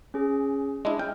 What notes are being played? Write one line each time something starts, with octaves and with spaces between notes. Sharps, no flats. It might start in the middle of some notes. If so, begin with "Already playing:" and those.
C#4 G#4
G#3 D4 E4 D#5
G5 F6